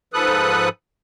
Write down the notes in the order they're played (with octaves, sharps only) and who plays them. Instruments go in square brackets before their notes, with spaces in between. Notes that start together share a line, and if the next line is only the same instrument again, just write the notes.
[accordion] G#2 F3 A4 B4 D#6 F#6